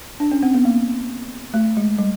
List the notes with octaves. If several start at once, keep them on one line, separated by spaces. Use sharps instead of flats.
D4
C#4
C4
B3
A#3
A3
G#3
G3